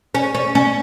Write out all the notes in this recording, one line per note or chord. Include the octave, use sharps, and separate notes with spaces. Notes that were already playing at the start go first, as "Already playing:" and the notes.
C#4
C#4
C#4